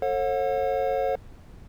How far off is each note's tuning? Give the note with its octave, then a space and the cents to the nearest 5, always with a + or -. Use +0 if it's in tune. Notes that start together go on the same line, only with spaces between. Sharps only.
A4 +20 C#5 -45 F#5 -40